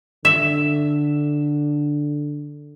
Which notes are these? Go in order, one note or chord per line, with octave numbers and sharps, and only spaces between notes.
D3 E5